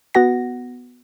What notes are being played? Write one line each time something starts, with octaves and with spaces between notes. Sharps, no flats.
B3 F#4 F#5 A#6